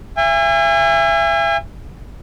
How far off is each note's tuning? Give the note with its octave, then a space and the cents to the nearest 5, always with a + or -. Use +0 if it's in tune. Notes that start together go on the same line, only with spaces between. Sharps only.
E5 +35 G#5 -35